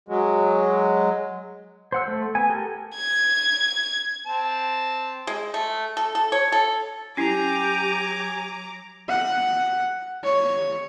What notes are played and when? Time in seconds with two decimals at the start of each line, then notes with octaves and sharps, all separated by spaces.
0.08 F#3 G#3
1.92 C5 F#5 E6
2.08 A3
2.35 B3 G#5
2.50 G4 A4 A#4
2.96 G#6
4.26 C4 A5
5.27 G#3
5.54 A3
5.97 A4
6.15 A4
6.32 C#5
6.52 A4
7.17 F#3 C#4 E4 G4 G#5 A#5 D6
9.08 F#5
10.24 C#5